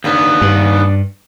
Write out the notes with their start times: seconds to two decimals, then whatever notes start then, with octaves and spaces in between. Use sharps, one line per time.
0.04 D#2 B3 D4
0.42 G2